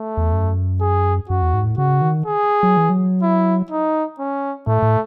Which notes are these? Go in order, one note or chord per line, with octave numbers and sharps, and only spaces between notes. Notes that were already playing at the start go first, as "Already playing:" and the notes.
Already playing: A3
E2
F#2
G#4
F#2 F#4
E2
G#2
A2
C#3 F#4
D#3
G#4
F#3
E3
F#3
E4
D#4
C#4
A2 A3
A2